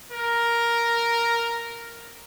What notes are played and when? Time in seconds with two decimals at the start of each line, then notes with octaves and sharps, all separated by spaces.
0.12 A#4